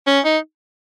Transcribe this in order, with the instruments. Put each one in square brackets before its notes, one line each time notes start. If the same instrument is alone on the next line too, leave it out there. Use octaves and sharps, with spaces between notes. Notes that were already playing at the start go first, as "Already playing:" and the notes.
[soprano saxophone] C#4
D#4